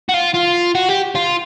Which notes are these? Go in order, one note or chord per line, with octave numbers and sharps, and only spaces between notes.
F#4
F4
F4
F#4
G4
F4